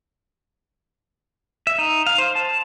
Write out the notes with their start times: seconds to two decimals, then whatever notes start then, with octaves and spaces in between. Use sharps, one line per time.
1.67 E5
1.78 D#4
2.07 F5
2.18 C5
2.35 A5